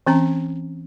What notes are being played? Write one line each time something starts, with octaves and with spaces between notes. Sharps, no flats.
E3 C4 C#4 A#5